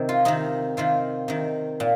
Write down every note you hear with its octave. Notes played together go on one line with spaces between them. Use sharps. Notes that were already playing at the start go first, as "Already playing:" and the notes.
Already playing: C3 D#3
F4
C3 D#3 D#4
C3 D#3 F4
C3 D#3
A#2